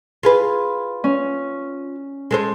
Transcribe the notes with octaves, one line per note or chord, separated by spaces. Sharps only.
F4 G#4 B4
C#4
G#3 A4 C5